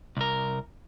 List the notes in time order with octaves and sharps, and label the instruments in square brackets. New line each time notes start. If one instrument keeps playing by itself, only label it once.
[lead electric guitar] C2 A#4